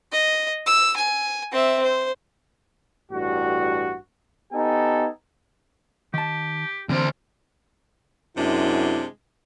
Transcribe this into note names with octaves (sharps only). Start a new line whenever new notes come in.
D#5
E6
G#5
C4 E5
C5
A1 G2 F#4
B3 D#4 G4 A4 G#5
D#3 G4 A5
D3 E3 C4 F4 C5
F#2 C3 G#3 D4 E4